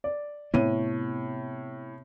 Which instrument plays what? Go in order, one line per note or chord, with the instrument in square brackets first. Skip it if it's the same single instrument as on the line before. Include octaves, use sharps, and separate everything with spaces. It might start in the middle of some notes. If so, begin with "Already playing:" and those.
[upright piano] D5
[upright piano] A2 D#7 [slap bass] C3 B3 C4